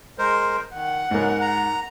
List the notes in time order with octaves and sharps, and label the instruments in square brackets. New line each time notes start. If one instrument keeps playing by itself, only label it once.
[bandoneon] G#3 A#4 C5
[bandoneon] D#3 [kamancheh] F#5
[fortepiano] G#2 A#4 [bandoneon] C#3 F#3 B3
[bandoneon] A#5